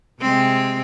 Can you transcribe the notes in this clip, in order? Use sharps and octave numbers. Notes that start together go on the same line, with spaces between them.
C3 G#3 C4